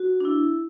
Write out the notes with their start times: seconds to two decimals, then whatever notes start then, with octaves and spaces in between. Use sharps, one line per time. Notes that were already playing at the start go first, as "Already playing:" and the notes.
Already playing: F#4
0.20 D4
0.25 E4